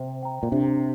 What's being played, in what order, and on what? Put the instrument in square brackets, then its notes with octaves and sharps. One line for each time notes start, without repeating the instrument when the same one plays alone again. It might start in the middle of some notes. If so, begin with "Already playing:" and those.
Already playing: [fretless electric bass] C3 [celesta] C5
[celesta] G5 A#5
[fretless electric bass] A#2
[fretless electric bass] C3 [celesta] D4